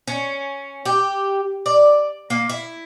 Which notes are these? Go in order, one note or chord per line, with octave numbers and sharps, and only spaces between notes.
C#4
G4
D5
A#3
E4